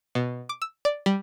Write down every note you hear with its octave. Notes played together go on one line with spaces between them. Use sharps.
B2
D6
E6
D5
G3